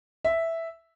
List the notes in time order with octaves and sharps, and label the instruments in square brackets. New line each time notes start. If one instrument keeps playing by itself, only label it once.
[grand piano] E5